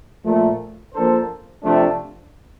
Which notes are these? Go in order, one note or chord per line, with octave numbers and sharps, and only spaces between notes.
A#2 F3 A3
F3 A#3 D4 A4 C5
C3 F3 A3 D4